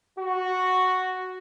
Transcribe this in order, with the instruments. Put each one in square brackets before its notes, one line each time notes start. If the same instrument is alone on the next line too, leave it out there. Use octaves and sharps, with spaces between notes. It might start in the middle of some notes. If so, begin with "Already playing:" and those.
[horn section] F#4